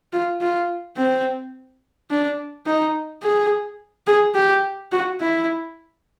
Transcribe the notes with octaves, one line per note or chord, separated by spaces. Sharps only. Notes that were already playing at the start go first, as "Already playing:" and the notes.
F4
F4
C4
D4
D#4
G#4
G#4
G4
F#4
E4